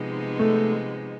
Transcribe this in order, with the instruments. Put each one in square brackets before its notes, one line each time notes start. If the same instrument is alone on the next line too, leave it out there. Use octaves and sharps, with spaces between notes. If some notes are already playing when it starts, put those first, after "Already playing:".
Already playing: [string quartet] C3 F3 G#3 B3 D#4
[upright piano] A3